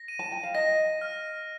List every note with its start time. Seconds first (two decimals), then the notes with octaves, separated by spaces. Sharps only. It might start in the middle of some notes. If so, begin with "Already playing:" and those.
Already playing: A#6
0.08 D#7
0.19 A5
0.32 G5
0.43 F5
0.54 D#5 A#6
1.01 F6